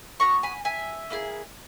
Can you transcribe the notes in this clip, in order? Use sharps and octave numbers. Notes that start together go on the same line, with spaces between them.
B3 F#4 A#5 C#6
G#5 B5
E5 G#5
A#3 E4 G#4